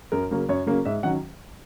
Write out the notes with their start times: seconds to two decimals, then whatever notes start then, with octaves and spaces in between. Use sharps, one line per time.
0.12 F#2 A#4
0.31 C#3 F#3 A#3 C#4
0.49 F#2 C#5
0.67 C#3 F#3 A#3 C#4
0.85 G#2 E5
1.03 D#3 F#3 C#4 F#5